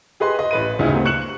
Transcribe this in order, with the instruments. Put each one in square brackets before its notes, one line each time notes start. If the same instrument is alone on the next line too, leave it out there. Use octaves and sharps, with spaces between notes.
[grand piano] G4 G#4 B4 D#5 C6
D#5
A1 B4 D#7
G1 D2 C#3 D#4 E4
A3 A#3 C4 G4
C#6 F#6 C#7 E7 F#7